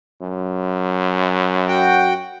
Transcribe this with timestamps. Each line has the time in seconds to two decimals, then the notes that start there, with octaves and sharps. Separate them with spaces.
0.22 F#2
1.68 F#4 G5